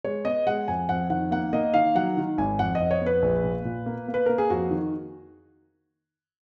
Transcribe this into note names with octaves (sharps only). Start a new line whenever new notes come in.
G#3 C#5
B3 D#5
G#3 F#5
F2 G#5
F2 F#5
D#3 F#5
A#3 F#5
A#3 D#5
D#3 F5
F#3 F#5
D#3
G#1 G#5
F2 F#5
D#5
F2
C#5
B3
B4
A#1
A#2
A#2
A#3
A#3
B4
A#3 A#4
G#4
F2 F#4
D#3